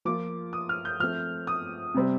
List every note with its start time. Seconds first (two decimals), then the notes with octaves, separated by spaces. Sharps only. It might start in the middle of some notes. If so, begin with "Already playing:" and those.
0.05 F3 A#3 F4 D6
0.53 D#6
0.69 F6
0.85 G6
1.00 F3 A3 C4 F6
1.47 D#6
1.94 C3 G3 C4